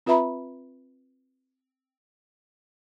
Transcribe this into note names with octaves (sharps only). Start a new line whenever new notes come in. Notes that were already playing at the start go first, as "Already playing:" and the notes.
C4 F4 B4 E5 A#5 B5